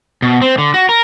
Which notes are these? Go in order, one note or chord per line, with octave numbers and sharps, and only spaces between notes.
B2
C4
D3
F#4
A#4